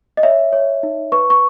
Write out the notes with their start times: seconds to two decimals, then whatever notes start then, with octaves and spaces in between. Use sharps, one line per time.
0.17 D#5
0.23 C#5 E5
0.53 C#5
0.83 D#4
1.12 B4 C#6
1.30 C#6